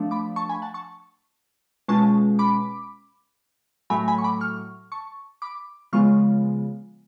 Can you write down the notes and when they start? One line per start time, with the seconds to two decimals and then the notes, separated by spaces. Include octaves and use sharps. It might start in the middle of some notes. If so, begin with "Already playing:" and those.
Already playing: F3 A3 D4
0.11 B5 D6
0.36 A5 C#6
0.49 G#5 B5
0.62 F#5 A5
0.74 A5 C#6
1.88 B2 G#3 C#4 F4 A5 C#6
2.39 B5 D6
3.90 A2 F#3 A3 G#5 B5
4.08 G#5 B5
4.18 C#6
4.24 B5 D6
4.41 C#6 F6
4.92 A5 C#6
5.42 B5 D6
5.93 C#3 F3 G#3 B3 F4 C#6 F6